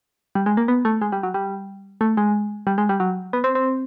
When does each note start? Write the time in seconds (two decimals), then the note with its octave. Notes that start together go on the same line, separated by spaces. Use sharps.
0.35 G3
0.46 G#3
0.57 A#3
0.68 B3
0.85 A3
1.01 G#3
1.12 G3
1.23 F#3
1.34 G3
2.01 A3
2.17 G#3
2.67 G3
2.78 G#3
2.89 G3
3.00 F#3
3.33 B3
3.44 C4
3.55 C4